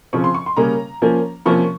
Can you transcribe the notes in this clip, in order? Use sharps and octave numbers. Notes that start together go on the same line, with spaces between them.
C#3 F3 C4 C#6
C6
C#6
C6
C#3 G3 A#3 C#4 A#5
F3 A#3 C#4
C3 F3 A#3 C#4 C#6